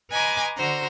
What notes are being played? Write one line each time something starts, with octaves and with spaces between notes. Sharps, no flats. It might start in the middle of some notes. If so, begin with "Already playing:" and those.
B4 D#5 G#5 A#5 C6 D6
D3 F#4 C5 A#5